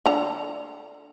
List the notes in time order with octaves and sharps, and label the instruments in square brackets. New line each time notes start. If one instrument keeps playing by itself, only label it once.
[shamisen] D3 A#5